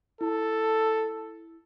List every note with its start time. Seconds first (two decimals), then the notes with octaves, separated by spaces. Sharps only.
0.21 E4 A4